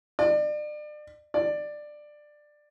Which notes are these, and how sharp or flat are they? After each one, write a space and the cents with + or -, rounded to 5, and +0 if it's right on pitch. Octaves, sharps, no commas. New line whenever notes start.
D5 +35
D5 +15